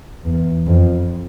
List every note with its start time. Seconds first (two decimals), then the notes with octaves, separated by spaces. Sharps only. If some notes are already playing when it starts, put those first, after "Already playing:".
0.25 E2
0.66 F2